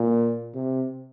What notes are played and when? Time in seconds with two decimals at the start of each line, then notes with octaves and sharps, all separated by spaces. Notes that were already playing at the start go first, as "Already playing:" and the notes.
Already playing: A#2
0.55 C3